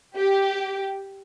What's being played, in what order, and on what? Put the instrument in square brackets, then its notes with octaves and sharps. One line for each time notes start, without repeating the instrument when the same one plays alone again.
[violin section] G4